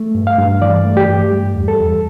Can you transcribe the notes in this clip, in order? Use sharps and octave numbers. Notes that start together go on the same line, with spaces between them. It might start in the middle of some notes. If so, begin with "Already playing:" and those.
Already playing: A3
G2
F5
G2
E3 D5
A3
G4
G2
G3
E2
A4
E2